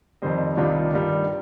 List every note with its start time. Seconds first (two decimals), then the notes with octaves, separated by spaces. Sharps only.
0.22 F2 D#3 G3 C5 D#5
0.57 C2 C3 D#3 G3 D4 F4
0.92 G2 D#3 G3